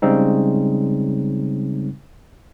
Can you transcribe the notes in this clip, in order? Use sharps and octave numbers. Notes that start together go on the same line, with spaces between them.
C#3 G3 G#3 C4 D#4